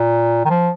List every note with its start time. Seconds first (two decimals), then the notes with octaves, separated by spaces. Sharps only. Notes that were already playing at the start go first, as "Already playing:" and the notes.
Already playing: A#2
0.45 D#3
0.50 F3